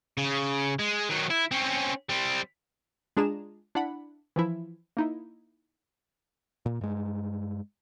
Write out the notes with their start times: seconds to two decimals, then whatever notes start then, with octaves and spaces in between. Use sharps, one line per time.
0.17 C#3
0.79 G#3
1.09 D#3 F#3
1.30 E4
1.51 C4 C#4
2.09 G3 C4
3.17 G#3 D4 F4 G#4 A#5 E7
3.75 D4 E4 F#5 B5
4.36 E3 F3 E4
4.97 A#3 D#4 E4
6.66 A#2
6.81 G2 G#3